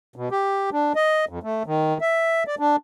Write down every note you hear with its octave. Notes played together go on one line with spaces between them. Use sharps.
B2
G4
D4
D#5
F2
A3
D#3
E5
D5
D4